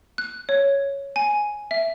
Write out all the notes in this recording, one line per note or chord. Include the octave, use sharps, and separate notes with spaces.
F#6
C#5
G#5
E5